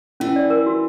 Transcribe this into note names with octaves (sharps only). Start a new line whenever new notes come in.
E3 C#4
D5
A#4
F#4